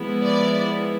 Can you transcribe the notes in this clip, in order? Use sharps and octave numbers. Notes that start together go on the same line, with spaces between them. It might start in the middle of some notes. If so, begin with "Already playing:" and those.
Already playing: F3 G#3 B3 E4
D5